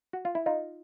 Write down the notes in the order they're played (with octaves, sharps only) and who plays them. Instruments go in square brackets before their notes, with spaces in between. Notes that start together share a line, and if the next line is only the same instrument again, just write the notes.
[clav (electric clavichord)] F#4
F4
E4
D#4 F4